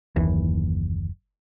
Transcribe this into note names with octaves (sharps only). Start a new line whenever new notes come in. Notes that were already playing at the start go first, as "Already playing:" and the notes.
F#1 D#2 E3